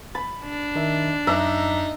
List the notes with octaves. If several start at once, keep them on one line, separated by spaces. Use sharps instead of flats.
B5 A6
D4
D#3 D#4 E5
F#2 D#4 E5 A#5 D6 F#6